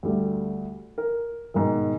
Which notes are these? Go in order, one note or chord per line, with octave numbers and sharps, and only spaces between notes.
D2 G3 A3
A#4
G#2 B2 D#3